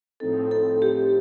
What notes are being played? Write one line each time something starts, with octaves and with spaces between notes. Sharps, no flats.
A2 F3 C4 D#4 A4
A4
G4